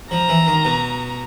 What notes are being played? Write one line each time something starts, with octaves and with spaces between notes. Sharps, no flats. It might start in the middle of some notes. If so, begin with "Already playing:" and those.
F3 A#5
E3
D#3
B2